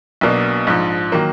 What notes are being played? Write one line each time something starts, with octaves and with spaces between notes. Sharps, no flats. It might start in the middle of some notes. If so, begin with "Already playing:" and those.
B1 B2 A#3 D4
A#1 G#2 F3
D#3 F#3 A#3